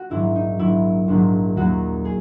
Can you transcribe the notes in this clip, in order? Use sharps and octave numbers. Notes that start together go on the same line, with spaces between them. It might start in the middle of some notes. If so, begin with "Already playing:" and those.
Already playing: F#4
A#1 G#2 D#3 F#3 E4
D#4
A#1 G#2 D#3 F#3 E4
A#1 G#2 D#3 F#3
D#2 D#3 F#3 A#3 F#4
G#4